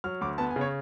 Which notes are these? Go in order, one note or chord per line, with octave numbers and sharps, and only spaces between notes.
F#3 F6
D2 D6
B3 A5
G#5
C#3
C#5